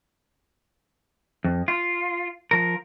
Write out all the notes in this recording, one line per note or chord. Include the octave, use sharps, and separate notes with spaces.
F2
F4
F3 A#4